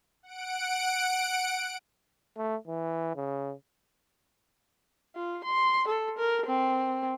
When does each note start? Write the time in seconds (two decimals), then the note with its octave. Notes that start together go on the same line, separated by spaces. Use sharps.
0.23 F#5 D7
2.37 A3
2.67 E3
3.16 C#3
5.16 F4
5.45 C6
5.88 A4
6.18 A#4
6.46 C4